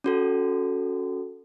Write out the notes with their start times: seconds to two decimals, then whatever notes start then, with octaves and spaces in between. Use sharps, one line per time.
0.04 C#4 F#4 A4